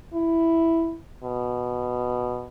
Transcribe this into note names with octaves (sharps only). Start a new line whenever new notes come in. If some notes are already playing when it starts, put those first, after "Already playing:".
E4
B2